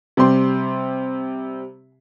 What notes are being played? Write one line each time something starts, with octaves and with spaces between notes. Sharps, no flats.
C3 G3 G4 C6